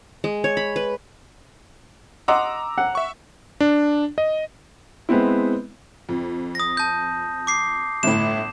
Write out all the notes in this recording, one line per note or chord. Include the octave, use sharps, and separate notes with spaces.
G#3
C#5
B5
B4
D#5 F#5 A#5 C6 D6 E6
F#5
E5 C#6
D4
D#5
G#3 B3 C4 E4
F2
D#6 A#6
A5 G6
D6 C7
G1 A2 E7